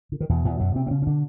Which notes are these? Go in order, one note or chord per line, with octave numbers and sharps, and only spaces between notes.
D3
D#3
E2 B2 E3
E2 E3
F#2 F#3
C3 C4
C4
C#3 C#4
C#4
D3 D4